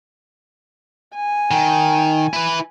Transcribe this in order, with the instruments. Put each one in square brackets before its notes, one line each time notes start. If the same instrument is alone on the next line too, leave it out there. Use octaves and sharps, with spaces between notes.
[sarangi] G#5
[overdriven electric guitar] D#3
E4 B4